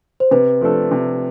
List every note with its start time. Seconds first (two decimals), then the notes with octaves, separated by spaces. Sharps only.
0.20 C5
0.31 C3 B4
0.61 F3 A3 D4 A4
0.92 C3